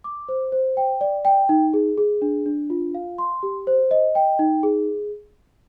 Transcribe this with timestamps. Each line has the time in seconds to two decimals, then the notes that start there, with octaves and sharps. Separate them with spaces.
0.04 D6
0.29 C5
0.52 C5
0.77 G5
1.01 D5
1.25 G5
1.49 D#4
1.73 G#4
1.98 G#4
2.22 D4
2.46 D4
2.70 F4
2.94 F5
3.18 C6
3.43 G4
3.67 C5
3.91 D#5
4.15 G5
4.39 D#4
4.63 G#4